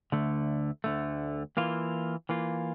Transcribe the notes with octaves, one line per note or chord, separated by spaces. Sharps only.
D2 D3 A3
D2 D3 A3
E3 A#3 F4
E3 A#3 F4